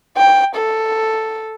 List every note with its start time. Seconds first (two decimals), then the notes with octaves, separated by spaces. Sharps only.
0.17 G5
0.56 A4